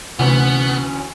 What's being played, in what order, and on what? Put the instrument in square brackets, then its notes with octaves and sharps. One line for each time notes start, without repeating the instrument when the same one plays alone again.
[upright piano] D2 E3 [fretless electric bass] C3 [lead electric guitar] B3 [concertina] C#4